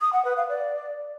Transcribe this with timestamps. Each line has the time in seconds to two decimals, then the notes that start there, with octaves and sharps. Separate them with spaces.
0.01 D#6
0.13 F#5
0.25 B4
0.37 F5
0.49 D5